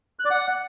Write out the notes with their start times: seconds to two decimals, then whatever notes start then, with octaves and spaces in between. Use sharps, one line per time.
0.19 F#6
0.25 D5
0.31 F#5